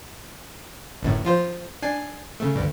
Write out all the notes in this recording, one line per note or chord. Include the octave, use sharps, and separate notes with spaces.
G1 F#2 A2
F3 F4 C5
D4 G#5 C7
C#3 A3
D2 G2